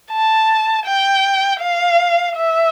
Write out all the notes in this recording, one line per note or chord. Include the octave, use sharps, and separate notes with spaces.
A5
G5
F5
E5